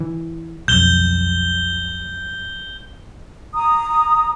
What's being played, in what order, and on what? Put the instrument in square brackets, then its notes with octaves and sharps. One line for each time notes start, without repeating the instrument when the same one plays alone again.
[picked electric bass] E3
[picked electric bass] B1 F2 [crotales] G6 G7
[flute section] A#5 D#6